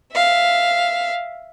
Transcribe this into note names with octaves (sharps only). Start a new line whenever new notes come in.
E5 F5